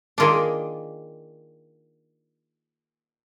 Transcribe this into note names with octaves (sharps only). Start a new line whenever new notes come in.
D#3 A#3 D4 F4 G#4